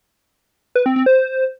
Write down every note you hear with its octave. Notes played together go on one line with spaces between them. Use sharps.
B4
C4
C4
C5